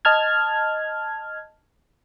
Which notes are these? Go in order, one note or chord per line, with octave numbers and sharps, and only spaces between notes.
D#5 A5 F6 G#6